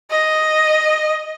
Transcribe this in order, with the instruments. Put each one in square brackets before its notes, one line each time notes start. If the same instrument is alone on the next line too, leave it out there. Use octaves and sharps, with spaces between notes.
[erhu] D#5